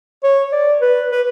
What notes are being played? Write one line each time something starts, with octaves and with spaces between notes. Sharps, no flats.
C#5
D5
B4
B4